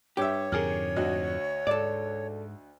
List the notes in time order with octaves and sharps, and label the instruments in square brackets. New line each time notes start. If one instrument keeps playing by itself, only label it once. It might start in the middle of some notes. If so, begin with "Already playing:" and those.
[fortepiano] G2 E5 [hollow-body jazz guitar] G4 [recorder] C#5
[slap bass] F2 G#2 D3 [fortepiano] G#4 A#4 F6
[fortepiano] D2 F#4 D#5
[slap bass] G#2 [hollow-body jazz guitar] A4 D5